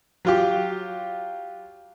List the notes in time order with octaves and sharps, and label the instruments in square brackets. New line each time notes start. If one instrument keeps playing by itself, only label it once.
[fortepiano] F#3 F4 G4